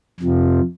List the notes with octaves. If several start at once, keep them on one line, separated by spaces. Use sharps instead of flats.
F2 C3 F3